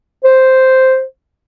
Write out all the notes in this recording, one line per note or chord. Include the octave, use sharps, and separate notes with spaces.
C5